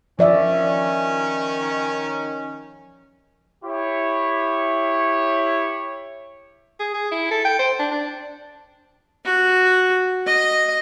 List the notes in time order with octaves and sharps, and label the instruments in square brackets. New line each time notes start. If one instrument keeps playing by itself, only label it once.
[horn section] D#3 C#4 [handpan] F3 D5 E5
[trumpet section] E4 G4 C#5
[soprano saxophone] G#4
G#4
E4
A4
G5
C5
D4
D4
[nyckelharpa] F#4
D#5